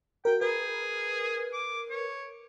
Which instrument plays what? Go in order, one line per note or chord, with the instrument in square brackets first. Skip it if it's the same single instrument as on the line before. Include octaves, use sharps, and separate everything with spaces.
[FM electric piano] F#4 A#4 [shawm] G5
[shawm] G#4 [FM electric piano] A#4 B4
[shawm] D6
C#5